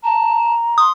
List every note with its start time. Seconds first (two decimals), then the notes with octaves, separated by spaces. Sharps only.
0.04 A5 A#5
0.78 C6 D#6